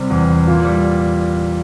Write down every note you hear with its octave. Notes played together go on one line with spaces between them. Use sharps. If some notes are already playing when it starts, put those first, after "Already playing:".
Already playing: C3 G3
E2
E2
A#2
G3